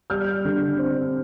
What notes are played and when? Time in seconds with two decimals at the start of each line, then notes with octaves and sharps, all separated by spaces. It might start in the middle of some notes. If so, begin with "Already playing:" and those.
0.10 G3 F6 G6
0.45 D3
0.79 C4